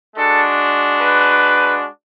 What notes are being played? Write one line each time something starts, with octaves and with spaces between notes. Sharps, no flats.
G#3 D4 F#4 A4
B4